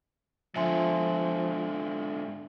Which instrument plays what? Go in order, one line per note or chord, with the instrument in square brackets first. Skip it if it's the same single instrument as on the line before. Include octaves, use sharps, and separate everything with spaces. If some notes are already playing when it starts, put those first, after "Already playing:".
[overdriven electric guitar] G#2 D3 [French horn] F3 [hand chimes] E5 G#5 C6